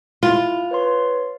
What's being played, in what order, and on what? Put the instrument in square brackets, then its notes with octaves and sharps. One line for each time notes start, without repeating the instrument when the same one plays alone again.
[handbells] E4 [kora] F4
[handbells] B4 C#5 C6